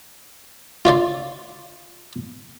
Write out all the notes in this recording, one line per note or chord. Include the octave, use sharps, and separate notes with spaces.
F4 C#5 D5 C6